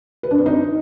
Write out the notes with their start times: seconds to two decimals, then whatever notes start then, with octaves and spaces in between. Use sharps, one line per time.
0.23 B4
0.31 D4
0.38 C4
0.46 D#4